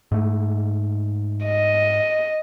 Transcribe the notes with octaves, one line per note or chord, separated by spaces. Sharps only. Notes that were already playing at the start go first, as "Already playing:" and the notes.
G#2 A3
D#5